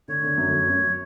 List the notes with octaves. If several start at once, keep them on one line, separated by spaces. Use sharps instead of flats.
D3 C#5
D3
F#2
F#2
F#2